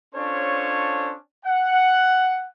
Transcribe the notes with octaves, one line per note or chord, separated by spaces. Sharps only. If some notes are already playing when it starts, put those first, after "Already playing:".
C#4 D4 F4 A4 C5 C#5
F#5